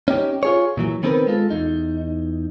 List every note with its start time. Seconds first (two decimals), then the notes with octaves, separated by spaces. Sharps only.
0.08 C#4 D#4 G4
0.43 F4 G#4 C#5
0.77 A#2 E3 F#3
1.03 D#3 B3 C4 G#4 A#4 B4
1.27 G#3 F4 A4
1.50 E2 D#4